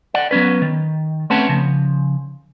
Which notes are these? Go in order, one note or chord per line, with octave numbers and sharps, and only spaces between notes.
D5 F#5
F#3 B3 C#4 B4
D#3
A3 C4 C#4 B4 F#5 A5
C#3 F3